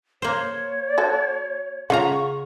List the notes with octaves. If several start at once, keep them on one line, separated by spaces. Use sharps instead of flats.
A#3 C5 C#5
F#4 A4
C#3 F4 F#5 A#5 C#6